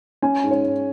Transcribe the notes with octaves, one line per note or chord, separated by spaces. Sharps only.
C#4 G#5
G#2
C#5
G#2